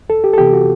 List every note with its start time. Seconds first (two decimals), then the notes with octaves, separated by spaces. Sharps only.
0.09 E2 A4
0.24 G4
0.34 A4
0.38 C3 E3 B3 G4
0.53 F#4